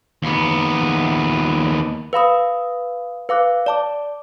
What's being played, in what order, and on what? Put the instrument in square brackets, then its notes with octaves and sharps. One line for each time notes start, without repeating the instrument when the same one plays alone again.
[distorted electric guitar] D#2 B3
[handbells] B4 F5 B5 D#6
B4 F5 D6 F#6
D5 A5 D6